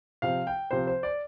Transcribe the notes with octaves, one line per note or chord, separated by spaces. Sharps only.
C3 F3 C4 F5
G5
C3 F3 C4 C5
C5
D5